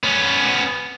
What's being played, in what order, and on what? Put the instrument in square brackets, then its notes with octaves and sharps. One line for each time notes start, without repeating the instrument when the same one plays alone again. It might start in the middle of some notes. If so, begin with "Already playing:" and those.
[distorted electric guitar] B3 C#4